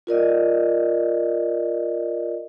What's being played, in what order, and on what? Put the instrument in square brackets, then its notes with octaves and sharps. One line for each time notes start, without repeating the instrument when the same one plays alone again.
[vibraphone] F4 A#4 D5 D#5